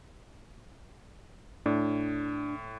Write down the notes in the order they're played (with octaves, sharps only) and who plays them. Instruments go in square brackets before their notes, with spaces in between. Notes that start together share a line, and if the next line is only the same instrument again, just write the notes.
[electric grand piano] A2 [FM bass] D4